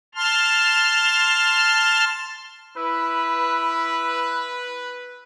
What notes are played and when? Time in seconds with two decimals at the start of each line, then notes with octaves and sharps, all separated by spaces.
0.15 A5 C6 F6
2.77 E4 B4